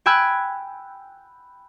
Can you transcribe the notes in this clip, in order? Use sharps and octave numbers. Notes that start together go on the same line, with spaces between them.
G5 G#5 B5 E6 F#6 G#6